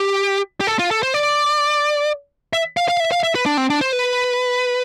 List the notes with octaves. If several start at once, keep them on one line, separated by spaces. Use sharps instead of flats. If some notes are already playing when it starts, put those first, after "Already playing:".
Already playing: G4
G4
A4
F4
A4
C5
D5
E5
F5
F5
E5
F5
E5
B4
D4
C4
D4
C5
B4